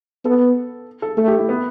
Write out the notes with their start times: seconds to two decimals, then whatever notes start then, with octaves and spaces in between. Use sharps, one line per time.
0.25 B3 A4
1.02 A4
1.17 A3 A4
1.28 G4
1.39 E4
1.49 B3